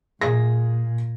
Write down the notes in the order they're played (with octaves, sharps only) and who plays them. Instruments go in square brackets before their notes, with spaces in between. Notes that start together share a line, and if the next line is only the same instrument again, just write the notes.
[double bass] A#2 [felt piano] G#4 A#6